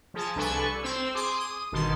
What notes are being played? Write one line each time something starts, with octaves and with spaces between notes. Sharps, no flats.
F3 G#4 A5
C2 D4 A4 B4 G#5 C#6
C4 C5 E6
G#4 C6 D6
D#6
G1 B2 D#3 A5 C6